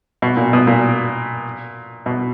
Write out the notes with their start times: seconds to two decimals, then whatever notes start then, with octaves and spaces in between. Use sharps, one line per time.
0.22 B2
0.37 A#2
0.53 B2
0.67 A#2
2.06 B2